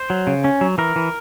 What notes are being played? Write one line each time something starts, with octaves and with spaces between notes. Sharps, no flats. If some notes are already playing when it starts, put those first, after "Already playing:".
Already playing: C5
F#3
C#3
C#4
F#3
E3 A#4
E3